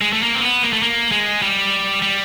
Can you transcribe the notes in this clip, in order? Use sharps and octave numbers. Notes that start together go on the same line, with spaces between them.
G#3
A3
A#3
C4
B3
A#3
A3
A#3
G#3
G3
G3